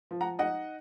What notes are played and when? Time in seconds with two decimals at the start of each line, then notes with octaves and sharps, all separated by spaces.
0.11 F3
0.21 F#5 A#5
0.39 D#4 D#5 F#5